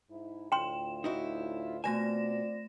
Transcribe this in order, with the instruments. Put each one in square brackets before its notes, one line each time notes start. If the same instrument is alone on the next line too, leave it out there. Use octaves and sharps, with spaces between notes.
[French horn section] G#2 D#4 E4
[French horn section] D2 A2 F4 [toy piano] G5 C6 [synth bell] E7
[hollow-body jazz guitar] D#4 E4 F#4
[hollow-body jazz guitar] B2 G#5 [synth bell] A3 A#6 E7 [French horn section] C4 F4 D5